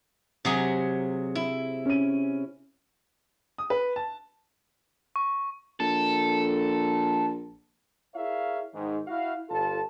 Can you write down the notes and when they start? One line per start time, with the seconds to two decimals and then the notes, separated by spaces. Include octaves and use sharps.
0.45 C3 F#3 G#4
1.35 E4
1.85 C#4 D#7
3.58 D#6
3.70 B4
3.96 A5
5.16 C#6
5.80 A#1 A4
8.15 E4 G#4 A#4 C#5 E5 F5
8.74 G#2 D#3
9.07 E4 F#4 F5
9.49 G1 F4 A4 A5